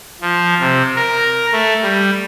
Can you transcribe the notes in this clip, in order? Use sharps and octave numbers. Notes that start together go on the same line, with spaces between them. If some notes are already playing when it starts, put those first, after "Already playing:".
F3
C3
A#4
A3
G3